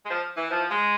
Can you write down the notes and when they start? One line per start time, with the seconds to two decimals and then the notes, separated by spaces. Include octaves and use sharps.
0.06 G#3
0.11 F3
0.37 E3
0.51 F3
0.71 G#3